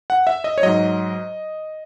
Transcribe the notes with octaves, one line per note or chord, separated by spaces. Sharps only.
F#5
E5
D#5
C#5
G#2 F#3 D#5